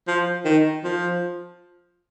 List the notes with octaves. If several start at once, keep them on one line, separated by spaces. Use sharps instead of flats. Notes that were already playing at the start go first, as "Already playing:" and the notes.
F3
D#3
F3